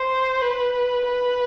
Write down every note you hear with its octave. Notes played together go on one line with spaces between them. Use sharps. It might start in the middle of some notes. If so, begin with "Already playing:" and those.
Already playing: C5
B4
B4